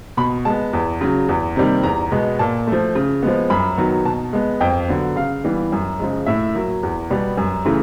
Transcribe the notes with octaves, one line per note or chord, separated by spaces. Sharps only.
B2 B5
G#3 B3 A5
E2
C#3 F#3
E2
C3 D#3 G3 A#3
E2 A#5
B2 G#3 B3
A#2 A5
F3 A3
C#3
F3 G#3 B3
F#2 B5
D#3 F#3 B3
B2 A5
G#3 B3
F2 G5
D3 F#3 B3
C#3 F5
E3 G3 B3
F#2
C#3 F3 G#3
A2 E5
F#3 A#3
E2
B2 G3 B3
F#2
C#3 E3 A3